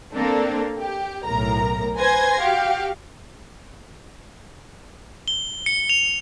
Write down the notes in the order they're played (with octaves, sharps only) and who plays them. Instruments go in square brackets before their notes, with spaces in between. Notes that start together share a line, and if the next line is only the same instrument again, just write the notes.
[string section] A#3 C4 D4 A4
G4
B1 A2 A#4 A#5
B4 C5 G#5 C6 G#6 A#6
F#4 G4 F5
[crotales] G7
C#7
F7